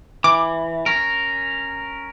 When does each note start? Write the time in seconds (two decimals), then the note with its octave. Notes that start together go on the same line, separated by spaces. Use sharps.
0.24 E3 D6
0.86 C#4 A#4